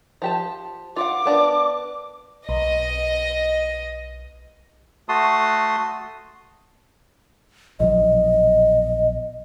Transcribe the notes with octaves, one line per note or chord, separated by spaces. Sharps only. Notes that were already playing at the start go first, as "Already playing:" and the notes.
F3 G4 A5
F4 F5 F#5 D6
B3 D4 A#4
B1 D#5
A3 F#4 A5 C6 D#6
A#1 B2 F#3 D#5